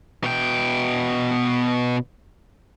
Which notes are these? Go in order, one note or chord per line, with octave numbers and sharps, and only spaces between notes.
B2 G5